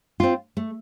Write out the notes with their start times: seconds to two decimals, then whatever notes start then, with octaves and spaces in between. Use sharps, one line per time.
0.20 C4 F4
0.57 A3